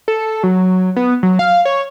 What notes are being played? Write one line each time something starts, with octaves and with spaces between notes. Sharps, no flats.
A4
F#3
B3
F#3
F5
C#5